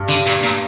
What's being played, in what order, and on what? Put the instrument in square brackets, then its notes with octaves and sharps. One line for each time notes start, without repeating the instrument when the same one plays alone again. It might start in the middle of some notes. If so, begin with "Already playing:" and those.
Already playing: [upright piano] G2
[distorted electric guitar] D3
A#2
A#2